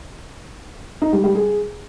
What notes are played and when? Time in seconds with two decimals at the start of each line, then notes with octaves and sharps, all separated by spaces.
1.02 D#4
1.13 G3
1.24 G3
1.35 G#4